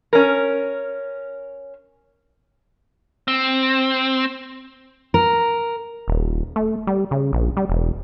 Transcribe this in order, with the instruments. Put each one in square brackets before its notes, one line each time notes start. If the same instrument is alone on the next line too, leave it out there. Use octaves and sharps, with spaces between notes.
[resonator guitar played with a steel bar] C#4 A#4
[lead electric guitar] C4
[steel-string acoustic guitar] A#4
[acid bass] D#1
A3
G3
C#3
A#1
G3
E1